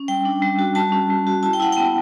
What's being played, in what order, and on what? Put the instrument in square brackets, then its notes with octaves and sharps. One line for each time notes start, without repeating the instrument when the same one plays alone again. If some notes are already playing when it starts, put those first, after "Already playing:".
Already playing: [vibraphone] C#4
G3 G5
D4
G3
F#4
G3 A5
C#4
G3
F#4
E4 A5
G5
E4 F#5
B3 G5